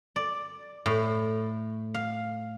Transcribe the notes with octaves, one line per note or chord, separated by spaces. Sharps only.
D5
A2
F5